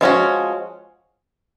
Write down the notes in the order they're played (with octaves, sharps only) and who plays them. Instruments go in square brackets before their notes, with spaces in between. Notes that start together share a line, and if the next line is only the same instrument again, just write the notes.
[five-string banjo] F3 G#3 C#4 F#4